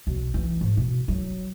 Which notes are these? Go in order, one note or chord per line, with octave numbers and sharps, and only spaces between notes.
B1
E3
G#2
B2
F#3